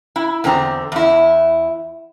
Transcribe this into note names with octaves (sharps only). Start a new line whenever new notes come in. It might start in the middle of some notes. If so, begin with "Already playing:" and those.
E4
E2 D3 C4 A#5
E2 E4